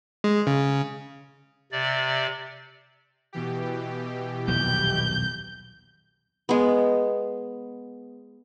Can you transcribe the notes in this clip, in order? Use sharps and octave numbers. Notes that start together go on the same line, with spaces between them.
G#3
C#3
C3 D5
B2 E3 G4
D#1 B1 F2 G6
G#3 B3